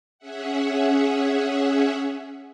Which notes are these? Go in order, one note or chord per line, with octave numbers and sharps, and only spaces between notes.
C#4 G#4 E5 F#5